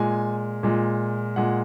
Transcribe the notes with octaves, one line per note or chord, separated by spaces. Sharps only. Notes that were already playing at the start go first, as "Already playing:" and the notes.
Already playing: A#2 G#3 G#5
A#2 G#3
A#2 G#3 F#5